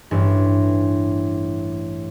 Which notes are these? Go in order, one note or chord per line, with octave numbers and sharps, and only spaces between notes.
A1 G2